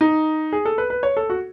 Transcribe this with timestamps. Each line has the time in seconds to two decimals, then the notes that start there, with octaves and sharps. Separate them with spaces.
0.01 D#4
0.53 G#4
0.65 A4
0.78 B4
0.90 B4
1.03 C#5
1.17 A4
1.30 F#4